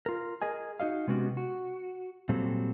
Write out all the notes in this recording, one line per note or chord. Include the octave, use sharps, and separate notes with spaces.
F4 A#4
G#4 A#4 D#5 G#5
D#4 F#4 D#5 F5
C3 G#3 B3 C#4 F#4 G4
F#4
A#2 F#3 G3 C4 A4